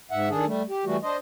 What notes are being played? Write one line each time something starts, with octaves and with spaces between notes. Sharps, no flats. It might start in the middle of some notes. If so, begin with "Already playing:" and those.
G#2 E5 F#5
D#3 D4 G#4 A4
G3 A3
G4
E3 G3 A3 F#4
D4 C5 D#5